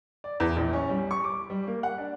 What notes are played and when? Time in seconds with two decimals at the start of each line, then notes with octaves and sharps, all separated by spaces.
0.24 D5
0.40 E2
0.57 A#1
0.73 C#4
0.89 G3
1.11 C#6
1.24 D6
1.50 G3
1.67 A#3
1.83 F#5
1.98 D4